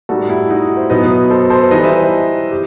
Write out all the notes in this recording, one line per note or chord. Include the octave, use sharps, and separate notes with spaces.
A2 G3 D#4 F#4 A4
E4 G4
D#4 F#4
C5 E5
B2 F#3 B3 D#4 B4 D#5
A4 C5
A4 C5
E3 G3 D#4 B4 D#5
C5 E5
G4